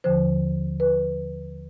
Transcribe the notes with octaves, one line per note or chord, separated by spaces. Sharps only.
D#2 D3 F3 C5
B4